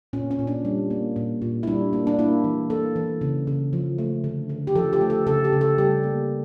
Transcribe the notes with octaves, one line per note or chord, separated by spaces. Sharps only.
A#2 C#4
C#4
A#2
D4
G3
A#3
A#2
A#2
E4
G3 D4
A#3
D4
A#3 E4
E3
A#3 A4
E3
C#3
C#3
F3
A3
D3
D3
G4
F3 A4
G4
A3
A4
C#3 A4
G4
C#3
A4
G3 G4
A#3